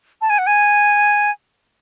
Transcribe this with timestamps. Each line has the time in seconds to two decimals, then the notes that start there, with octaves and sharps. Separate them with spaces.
0.21 A5
0.30 G#5
0.38 F#5
0.47 G#5